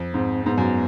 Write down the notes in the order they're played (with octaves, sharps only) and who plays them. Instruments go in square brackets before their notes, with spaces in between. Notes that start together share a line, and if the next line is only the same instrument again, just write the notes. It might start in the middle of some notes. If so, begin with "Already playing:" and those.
Already playing: [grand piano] F2
[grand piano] G#2 [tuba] C4
[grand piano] G#2 [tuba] B3
[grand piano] F#2